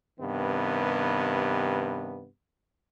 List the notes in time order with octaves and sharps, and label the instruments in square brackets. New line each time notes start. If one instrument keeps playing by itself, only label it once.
[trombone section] G2 C3 D#3 B3